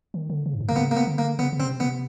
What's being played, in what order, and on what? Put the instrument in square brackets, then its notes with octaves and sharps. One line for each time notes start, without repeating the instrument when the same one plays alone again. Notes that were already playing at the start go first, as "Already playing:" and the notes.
[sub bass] D#3
D3
C#3
G2
G#2
[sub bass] C3 [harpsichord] A#3
[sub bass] C#3 [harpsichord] B3
[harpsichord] A#3
B3
[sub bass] D3
[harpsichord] A#3
[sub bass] C#3 [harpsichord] B3
[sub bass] C#3
[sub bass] C3 [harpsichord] C4
[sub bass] C3 [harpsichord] B3